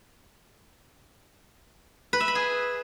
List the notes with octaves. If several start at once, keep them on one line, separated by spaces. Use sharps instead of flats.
B4
E5
B5
G#4